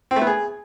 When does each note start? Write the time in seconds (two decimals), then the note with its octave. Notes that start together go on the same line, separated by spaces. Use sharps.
0.11 C4
0.16 A3
0.22 B3
0.27 G#4